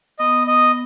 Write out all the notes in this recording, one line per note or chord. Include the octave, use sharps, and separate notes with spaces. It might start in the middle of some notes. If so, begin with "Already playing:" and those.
B3 D#5
D#5